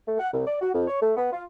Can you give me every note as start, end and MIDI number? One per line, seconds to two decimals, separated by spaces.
0.07 0.15 57
0.19 0.28 78
0.32 0.44 36
0.45 0.56 74
0.61 0.69 66
0.74 0.85 41
0.87 0.99 73
1.01 1.12 57
1.17 1.32 59
1.32 1.43 65